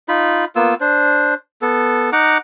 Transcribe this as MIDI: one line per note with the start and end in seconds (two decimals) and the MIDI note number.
0.08 0.45 63
0.08 0.45 65
0.08 0.45 83
0.56 0.74 58
0.56 0.74 59
0.56 0.74 65
0.56 0.74 88
0.81 1.34 62
0.81 1.34 72
1.62 2.10 59
1.62 2.10 69
2.13 2.38 63
2.13 2.38 78
2.13 2.38 82
2.13 2.38 86